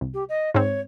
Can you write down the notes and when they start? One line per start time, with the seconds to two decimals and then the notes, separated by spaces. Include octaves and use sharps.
0.01 C2
0.14 G4
0.29 D#5
0.55 G#2 C4 C#5